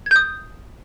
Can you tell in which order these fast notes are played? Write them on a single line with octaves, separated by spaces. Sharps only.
G#6 G6 D#6